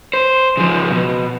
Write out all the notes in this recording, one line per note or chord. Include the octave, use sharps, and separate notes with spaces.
C5
C#3 F3
B2